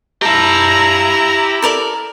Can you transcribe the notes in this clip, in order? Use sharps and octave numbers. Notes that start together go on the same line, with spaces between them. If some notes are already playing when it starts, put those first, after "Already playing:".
E4 G4 A5 A#5
A4 A#4 D5